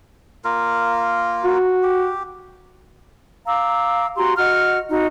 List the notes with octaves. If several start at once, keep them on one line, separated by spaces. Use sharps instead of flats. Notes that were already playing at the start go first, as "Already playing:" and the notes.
A#3 F4 A#4
F#4
G4
F5 A#5 D6 E6
F#4 G4 A#5 C6
F#4 D#5 F#5 F6
D#4 F#4